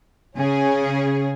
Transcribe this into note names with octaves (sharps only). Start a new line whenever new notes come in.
C#3 C#4 G#4